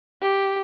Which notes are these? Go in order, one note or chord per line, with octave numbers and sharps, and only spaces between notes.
G4